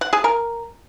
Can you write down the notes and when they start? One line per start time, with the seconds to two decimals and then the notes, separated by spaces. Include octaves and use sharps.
0.01 F#5
0.13 G#4
0.24 A#4